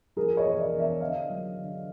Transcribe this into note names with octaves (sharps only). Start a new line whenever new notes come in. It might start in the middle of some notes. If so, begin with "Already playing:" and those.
F3 G#4 A#4
C#5 D#5
E1
D5 E5
E2
D5 E5
D3 D#5 F5
F#3
D3